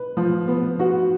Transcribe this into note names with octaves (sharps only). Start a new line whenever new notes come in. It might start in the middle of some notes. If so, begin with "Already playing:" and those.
Already playing: B4
F3
B3
F#4